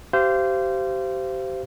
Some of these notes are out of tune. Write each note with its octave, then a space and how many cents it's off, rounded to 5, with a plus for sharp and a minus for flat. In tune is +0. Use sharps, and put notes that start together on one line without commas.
G4 -25 C5 -15 F5 -35